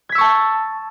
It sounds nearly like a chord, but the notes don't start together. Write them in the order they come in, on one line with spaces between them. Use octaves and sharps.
G#6 B6 E6 C#6 A5